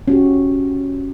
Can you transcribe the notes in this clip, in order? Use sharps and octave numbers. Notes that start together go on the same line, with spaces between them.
C#4 F#4 G4